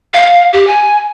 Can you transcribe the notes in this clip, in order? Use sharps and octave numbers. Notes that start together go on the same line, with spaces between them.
F5
G4
G#5